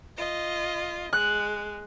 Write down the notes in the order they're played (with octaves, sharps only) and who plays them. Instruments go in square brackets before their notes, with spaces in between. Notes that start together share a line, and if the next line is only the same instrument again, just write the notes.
[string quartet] F4 D#5
[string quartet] G#3 [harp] F#6